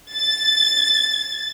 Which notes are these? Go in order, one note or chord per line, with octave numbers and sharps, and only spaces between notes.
A6